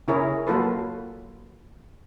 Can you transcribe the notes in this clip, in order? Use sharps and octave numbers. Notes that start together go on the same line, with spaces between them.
C#3 E4 G#4 A#4 C#5
F#3 A#3 F4 A4 B4